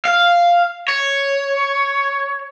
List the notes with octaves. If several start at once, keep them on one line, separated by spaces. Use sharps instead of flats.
F5
C#5